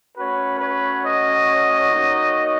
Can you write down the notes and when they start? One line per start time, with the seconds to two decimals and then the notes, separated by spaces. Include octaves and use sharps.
0.16 A3 C#4 F#4 B4 C#5
0.59 B4 C#5
1.02 C#5 D#5
1.89 A#3 D#4 F#4